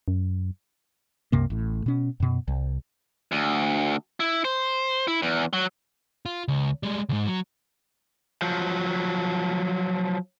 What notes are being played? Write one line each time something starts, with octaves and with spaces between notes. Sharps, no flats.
F#2
C2 F#2 C3 A#3
A1 A2
B2 C#4
F#2 B2
C2
D2
E4
C5
E4
E2
F#3
F4
C#2
G3 G#3
C#2 G#2
F#3
F3 F#3